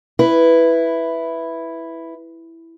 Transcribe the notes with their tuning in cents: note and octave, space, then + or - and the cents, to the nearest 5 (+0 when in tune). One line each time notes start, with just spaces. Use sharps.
E4 +0 B4 +0